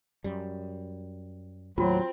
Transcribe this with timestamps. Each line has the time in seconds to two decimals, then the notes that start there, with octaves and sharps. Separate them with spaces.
0.24 F#2 G3
1.78 D#2 A2 F#3 C4 F4 F#4